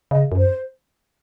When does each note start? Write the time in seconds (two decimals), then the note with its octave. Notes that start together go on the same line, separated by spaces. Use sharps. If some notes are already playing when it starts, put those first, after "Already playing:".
0.11 C#3 D#5
0.32 F#2
0.38 C5